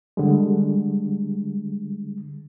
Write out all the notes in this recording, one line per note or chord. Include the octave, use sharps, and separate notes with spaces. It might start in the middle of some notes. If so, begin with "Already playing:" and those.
D3 G3 G#3